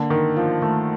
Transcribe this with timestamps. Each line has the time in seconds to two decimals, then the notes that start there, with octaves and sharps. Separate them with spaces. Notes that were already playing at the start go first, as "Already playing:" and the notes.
Already playing: D3 A#3
0.10 D#3 A#4
0.37 F3 F4
0.62 D#3 A3